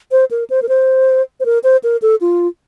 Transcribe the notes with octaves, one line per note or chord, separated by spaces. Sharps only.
C5
A#4
C5
A#4
C5
C5
A#4
C5
A#4
A4
F4